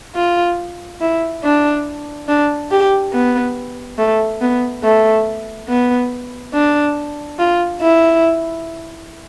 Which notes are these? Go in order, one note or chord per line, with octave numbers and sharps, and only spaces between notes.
F4
E4
D4
D4
G4
B3
A3
B3
A3
B3
D4
F4
E4